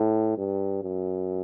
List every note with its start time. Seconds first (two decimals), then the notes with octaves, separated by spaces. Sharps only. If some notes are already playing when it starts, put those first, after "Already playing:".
Already playing: A2
0.38 G2
0.83 F#2